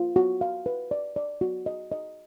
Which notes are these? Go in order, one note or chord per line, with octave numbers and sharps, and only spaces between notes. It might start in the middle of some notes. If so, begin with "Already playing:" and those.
Already playing: F4
F#4
F5
B4
D5
D5
F#4
D#5
D#5